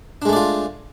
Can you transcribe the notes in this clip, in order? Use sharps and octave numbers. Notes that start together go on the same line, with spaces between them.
G#3 A3 D4 F4 D5